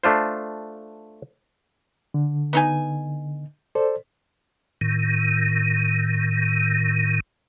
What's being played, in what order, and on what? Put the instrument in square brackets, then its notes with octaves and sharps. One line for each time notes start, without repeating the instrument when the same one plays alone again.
[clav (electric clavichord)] A3 D4 F4 C5
[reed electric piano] D3
[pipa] B3 D#4 G#5
[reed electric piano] A4 C5 D5
[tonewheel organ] A2 D#3